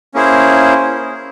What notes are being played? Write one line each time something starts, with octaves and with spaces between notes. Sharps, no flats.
A#3 C#4 E4 G#4 C5